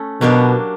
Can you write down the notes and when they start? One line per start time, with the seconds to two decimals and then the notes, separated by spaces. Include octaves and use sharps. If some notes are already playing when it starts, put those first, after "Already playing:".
Already playing: A3 C#4
0.21 B2 F#3 A#3 D4 G4